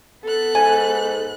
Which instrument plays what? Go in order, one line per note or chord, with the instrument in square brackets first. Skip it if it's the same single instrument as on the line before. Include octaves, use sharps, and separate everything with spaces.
[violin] B3 F#6 [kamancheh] A4
[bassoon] G#2 [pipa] G#5